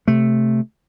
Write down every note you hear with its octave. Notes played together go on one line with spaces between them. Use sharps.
C3 A3